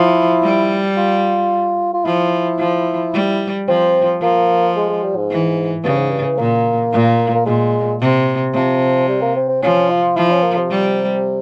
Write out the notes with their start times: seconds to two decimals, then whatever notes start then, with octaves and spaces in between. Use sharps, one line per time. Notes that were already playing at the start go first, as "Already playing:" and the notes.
Already playing: F3 E4
0.43 G3
0.97 F4
1.94 F4
2.05 F3 E4
2.59 F3
3.13 G3
3.68 F3 C4
4.21 F3 A#3
4.76 G#3
4.89 G#3
5.03 G3
5.16 G#2
5.31 E3
5.84 G2 C#3
5.98 G#2
6.10 G2
6.24 E3
6.38 A#2 A#3
6.92 A#2
7.35 A#3
7.46 A#2 G#3
8.01 C3
8.54 C3 F3
9.08 G3
9.22 A#3
9.36 C4
9.48 C4
9.62 F3 C#4
9.89 F4
10.16 F3 E4
10.31 C#4
10.43 A#3
10.58 C3
10.71 G3